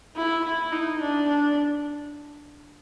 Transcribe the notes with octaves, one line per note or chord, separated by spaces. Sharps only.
E4
E4
D#4
D4
D4